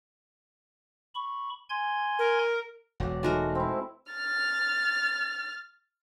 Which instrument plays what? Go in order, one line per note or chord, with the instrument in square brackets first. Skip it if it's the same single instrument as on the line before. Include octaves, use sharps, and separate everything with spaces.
[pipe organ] B5 C#6
G#5 C6 G#6
[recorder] A#4
[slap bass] E1 [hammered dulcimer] F#3 D5 F#5
[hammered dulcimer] G#3 D#4 [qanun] A3 F#4 A#4
[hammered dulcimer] C4 E4
[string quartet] F6 A6